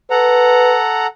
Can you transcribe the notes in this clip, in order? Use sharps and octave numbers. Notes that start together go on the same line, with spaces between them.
A4 B4 F#5 A#5